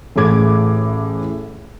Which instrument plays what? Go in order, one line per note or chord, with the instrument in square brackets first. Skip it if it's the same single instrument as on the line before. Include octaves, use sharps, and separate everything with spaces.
[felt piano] A1 A2 G#4 D6 G#6